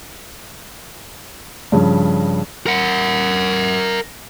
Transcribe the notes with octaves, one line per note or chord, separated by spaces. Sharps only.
G2 C#3 F3
A#4 F#5